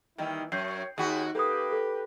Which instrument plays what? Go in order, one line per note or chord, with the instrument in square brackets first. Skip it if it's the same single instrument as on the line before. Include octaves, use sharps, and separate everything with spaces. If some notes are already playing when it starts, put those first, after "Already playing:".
[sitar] D#3 G3 [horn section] E3 A#3 E4
[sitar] F#2 [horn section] C#5 [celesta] G6 C7
[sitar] D#2 F#4 [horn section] G#4 G5 B5
[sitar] A#3 [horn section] G4 B4 [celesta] A4 D#6
[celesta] A4